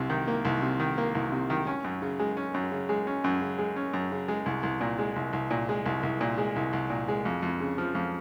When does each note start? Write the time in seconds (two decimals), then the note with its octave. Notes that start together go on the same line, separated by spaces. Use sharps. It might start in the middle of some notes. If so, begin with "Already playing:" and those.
Already playing: C2 C3
0.10 D#3
0.28 A#3
0.45 C2
0.62 C3
0.80 D#3
0.98 A#3
1.15 C2
1.32 C3
1.50 D#3
1.67 C#4
1.84 F#2
2.02 C#3
2.19 G#3
2.37 C#4
2.54 F#2
2.72 C#3
2.89 G#3
3.07 C#4
3.24 F#2
3.42 C#3
3.58 G#3
3.76 C#4
3.93 F#2
4.11 C#3
4.28 G#3
4.46 C2
4.63 C2
4.81 A#2
4.99 G#3
5.16 C2
5.33 C2
5.51 A#2
5.69 G#3
5.86 C2
6.03 C2
6.21 A#2
6.38 G#3
6.56 C2
6.73 C2
6.90 A#2
7.08 G#3
7.25 F2
7.42 F2
7.60 C#3
7.78 F3
7.95 F2